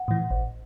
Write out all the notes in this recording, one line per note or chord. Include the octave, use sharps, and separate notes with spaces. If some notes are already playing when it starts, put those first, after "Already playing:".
Already playing: F#5
A2 E3
A1